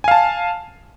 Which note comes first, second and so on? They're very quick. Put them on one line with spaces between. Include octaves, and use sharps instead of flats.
G#5 F5 A5